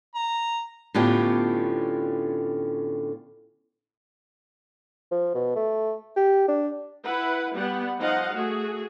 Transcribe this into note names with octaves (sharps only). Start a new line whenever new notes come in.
A#5
A2 D3 B3 C#4 F4 G4
F3
B2
A3
G4
D4
E4 B4 F#5
G3 B3 F#5
F3 D#4 D#5 F5 F#5
A3 F#4 G#4